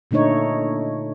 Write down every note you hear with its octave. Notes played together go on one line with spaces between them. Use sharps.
A#2 D3 A3 D#4 C#5